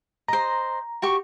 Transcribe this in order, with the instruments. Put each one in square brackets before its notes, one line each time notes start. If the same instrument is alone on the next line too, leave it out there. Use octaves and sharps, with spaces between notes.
[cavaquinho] C5 D#5 [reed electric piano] A#5
[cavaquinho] F#4 G4 C#6